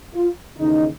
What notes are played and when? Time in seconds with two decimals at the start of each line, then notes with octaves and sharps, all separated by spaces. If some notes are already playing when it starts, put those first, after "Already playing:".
0.15 F4
0.58 D#2 C#3 E3 D#4